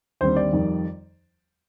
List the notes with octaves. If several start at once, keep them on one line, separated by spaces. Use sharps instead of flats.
D#2 D3 G3 C4 C5
D5
F2 D#3 G3